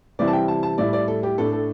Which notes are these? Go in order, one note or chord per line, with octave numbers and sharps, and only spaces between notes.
C3 E3 G3 C4 E4 D5
A5
G5
A5
A5
A2 G3 E4 D5
D5
A4
G4
A2 A3 D4 A4
A4